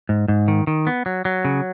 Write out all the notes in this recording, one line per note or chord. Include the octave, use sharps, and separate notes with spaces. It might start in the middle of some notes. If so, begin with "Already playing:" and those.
G#2
G#2
D#3
D#3
B3
F#3
F#3
C#3